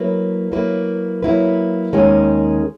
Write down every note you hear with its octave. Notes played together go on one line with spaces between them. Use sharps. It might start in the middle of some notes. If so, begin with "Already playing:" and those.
Already playing: F#3 A#3 E4 B4
F#3 A#3 E4 B4
F#3 A#3 E4 B4
D#2 D#3 G#3 C#4 G#4